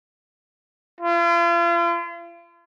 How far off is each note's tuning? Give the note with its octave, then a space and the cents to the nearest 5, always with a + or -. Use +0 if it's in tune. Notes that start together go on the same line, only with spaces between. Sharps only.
F4 -40